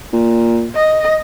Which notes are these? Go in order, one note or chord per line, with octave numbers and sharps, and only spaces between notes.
A#2
D#5